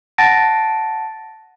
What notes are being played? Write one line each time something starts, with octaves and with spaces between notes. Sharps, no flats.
F#5 A5 A6 A#6 D7